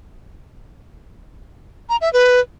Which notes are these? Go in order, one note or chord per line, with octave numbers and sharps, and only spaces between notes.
A#5
E5
B4